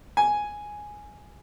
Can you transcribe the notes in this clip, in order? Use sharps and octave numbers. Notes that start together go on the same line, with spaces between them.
G#5